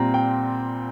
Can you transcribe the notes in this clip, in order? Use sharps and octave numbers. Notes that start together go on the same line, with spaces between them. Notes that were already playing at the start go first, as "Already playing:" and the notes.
Already playing: A#2 G3 C4 A#5
G5